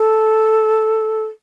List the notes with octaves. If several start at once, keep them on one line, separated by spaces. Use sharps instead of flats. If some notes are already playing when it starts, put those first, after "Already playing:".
Already playing: A4